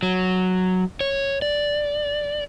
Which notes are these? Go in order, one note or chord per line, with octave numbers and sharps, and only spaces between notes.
F#3
C#5
D5